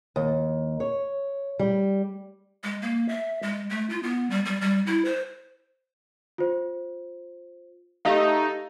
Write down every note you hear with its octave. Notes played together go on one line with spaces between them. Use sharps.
D#2
C#5
G3
G#3
A#3
E5
G#3
A3
F4
B3
G3
G3
G3
E4
C5
F4 C5
A3 D#4 G4 D#5 F5